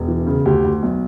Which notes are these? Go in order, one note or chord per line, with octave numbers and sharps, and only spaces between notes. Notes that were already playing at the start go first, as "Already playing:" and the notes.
Already playing: E1
E3
C#3
D2 G4
D2
B1